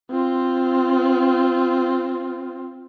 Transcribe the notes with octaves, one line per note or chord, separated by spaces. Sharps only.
C4 F4